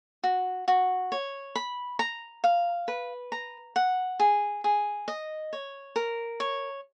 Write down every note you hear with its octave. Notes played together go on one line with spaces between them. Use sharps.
F#4
F#4
C#5
B5
A#5
F5
B4
A#5
F#5
G#4
G#4
D#5
C#5
A#4
C#5